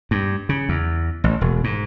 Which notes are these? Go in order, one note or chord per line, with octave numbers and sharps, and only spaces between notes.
G2
C#3
E2
A1
E1
G#2